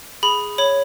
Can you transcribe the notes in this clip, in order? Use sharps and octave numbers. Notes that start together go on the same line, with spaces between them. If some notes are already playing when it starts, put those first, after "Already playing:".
G#4 B5
C#5 B5